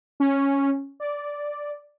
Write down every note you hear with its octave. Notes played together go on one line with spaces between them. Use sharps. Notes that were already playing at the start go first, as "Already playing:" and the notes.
C#4
D5